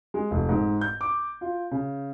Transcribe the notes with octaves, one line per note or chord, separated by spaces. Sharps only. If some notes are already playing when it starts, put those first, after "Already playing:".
G#3
F1
G#2
G6
D6
F4
C#3